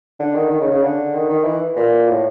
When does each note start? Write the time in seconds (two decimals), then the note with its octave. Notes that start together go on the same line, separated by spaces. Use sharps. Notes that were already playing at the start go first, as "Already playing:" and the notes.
0.19 D3
0.35 D#3
0.50 D#3
0.61 C#3
0.71 C#3
0.83 D3
1.14 D#3
1.30 D#3
1.44 E3
1.76 A#2
2.08 A2